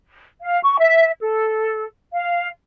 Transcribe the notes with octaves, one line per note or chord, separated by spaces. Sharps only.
F5
C#6
E5
A4
F5